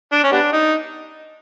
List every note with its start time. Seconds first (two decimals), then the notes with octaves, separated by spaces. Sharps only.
0.12 D4
0.24 C#4
0.32 G3 B3 D4
0.53 D#4